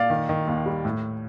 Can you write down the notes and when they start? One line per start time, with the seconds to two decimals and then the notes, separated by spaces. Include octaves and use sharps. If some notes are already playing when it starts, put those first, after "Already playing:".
Already playing: A#2 D5 F5
0.10 D#3
0.29 D#3
0.47 D#2
0.66 G3
0.85 A2